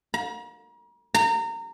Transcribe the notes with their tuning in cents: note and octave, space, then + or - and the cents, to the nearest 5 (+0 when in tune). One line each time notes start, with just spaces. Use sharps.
A#5 +40
A#5 -25